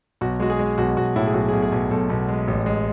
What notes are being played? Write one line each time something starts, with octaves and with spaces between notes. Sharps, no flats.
B1 F#4
G#3 F#4
G#4
G#3
B1 F#4
B1 F#4
A2 E4
G#4
B1 F#4
B1 G#4
G#4
B1
B1 A4
B1
G#3
A1
G#3